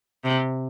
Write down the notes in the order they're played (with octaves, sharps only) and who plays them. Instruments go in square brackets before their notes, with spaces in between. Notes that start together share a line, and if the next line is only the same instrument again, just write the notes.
[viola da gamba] C3